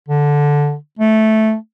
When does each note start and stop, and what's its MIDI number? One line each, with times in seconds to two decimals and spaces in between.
0.08 0.75 50
0.99 1.55 57